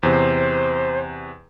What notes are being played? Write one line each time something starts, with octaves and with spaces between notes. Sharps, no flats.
E2 C3 C5